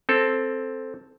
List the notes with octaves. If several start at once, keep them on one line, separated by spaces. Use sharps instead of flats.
C4 A4